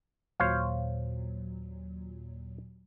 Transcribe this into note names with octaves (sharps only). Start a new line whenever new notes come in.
D#2 A#2 F#3 C5 C#5 F5